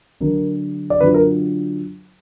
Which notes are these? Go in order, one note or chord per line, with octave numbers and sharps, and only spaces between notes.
D3 F#3 D4 A#4
D5
D3 F#3 D4 F4 B4
A#4